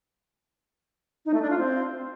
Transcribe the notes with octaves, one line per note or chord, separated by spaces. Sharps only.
D#4
A3
D4
F4
C4